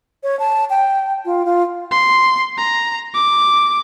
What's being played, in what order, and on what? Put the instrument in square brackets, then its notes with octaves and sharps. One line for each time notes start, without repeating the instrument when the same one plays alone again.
[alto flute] C#5
A5
G5
F4
F4
[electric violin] C6
A#5
D6